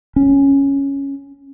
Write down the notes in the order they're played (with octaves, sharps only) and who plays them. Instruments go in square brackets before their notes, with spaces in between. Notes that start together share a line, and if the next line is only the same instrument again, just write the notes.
[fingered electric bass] C#4